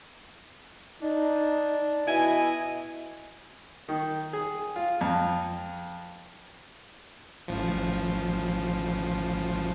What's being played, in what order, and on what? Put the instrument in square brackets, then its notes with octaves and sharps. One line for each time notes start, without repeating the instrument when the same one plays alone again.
[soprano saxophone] D4 [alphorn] D#4
[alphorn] B2 [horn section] E4 G#5 [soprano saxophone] D#5
[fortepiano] D#3
G#4
F4
F2
[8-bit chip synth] A1 F3